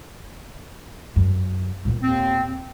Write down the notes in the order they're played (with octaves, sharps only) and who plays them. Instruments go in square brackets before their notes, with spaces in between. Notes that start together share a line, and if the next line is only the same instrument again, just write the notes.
[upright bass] F#2
A#2 B3
[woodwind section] D#2 C4